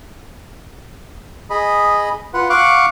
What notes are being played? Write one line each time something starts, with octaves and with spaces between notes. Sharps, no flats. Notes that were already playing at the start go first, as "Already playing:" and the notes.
G#4 D#5 B5
F4 B4 F#5
F5 F#5 C#6 D6 F#6